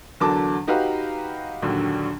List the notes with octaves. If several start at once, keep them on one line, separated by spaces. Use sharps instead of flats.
E2 D3 F#3 A#4 A5 D6
D#4 F#4 G4 B4 F5 A#5
A#1 D#2 D3 F#3